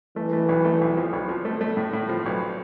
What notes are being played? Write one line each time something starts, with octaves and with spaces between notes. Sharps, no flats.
E3 A3
A3
B1
A3
B1
F3
B1
F3
A3
A3
A2
A2
F3
B1